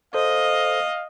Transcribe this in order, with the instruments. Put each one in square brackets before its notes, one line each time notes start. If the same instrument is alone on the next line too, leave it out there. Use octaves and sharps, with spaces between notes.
[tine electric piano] A4 C5 [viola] D#5 [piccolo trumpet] F5